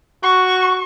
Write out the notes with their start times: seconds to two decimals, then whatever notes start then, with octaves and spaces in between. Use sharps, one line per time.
0.23 F#4 C#6